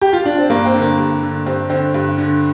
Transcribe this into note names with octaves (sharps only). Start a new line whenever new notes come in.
G4
F4
D4
C4
G2 A#3
C4
D3
A#3
G2
D3
G2 C4
D3 C4
G2
D3